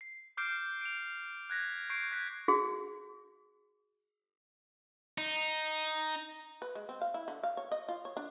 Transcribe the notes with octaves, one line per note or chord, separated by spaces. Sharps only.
C7
D6 F6 G6 C7 D7
D7 F7
F#6 G#6 A#6 B6
C#6 G6 C7 D7
F#6 G#6 B6
F#4 G#4
D#4
B4
G#3
C4
F5
E4
D3
F5
C#5
D#5
F4
C#5
D4